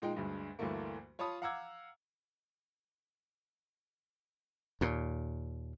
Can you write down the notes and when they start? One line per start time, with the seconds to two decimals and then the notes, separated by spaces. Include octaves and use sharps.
0.02 A#2 G#3 D#4 G5
0.15 D2 G2 G#3
0.59 D2 G2 D3 E3 A3 A#3
1.19 F4 C#5 A5 B5 D#6
1.42 F5 F#5 A#5 D6 E6 G#6
4.81 D#2 A#2